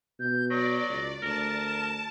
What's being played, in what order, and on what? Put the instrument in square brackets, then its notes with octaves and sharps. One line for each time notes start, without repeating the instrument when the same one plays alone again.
[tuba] B2 [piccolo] G6
[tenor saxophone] F#3 [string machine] D5 [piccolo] A#6
[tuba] C#2
[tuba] D2 [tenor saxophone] A#4 [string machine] A5 [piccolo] A#6
[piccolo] E7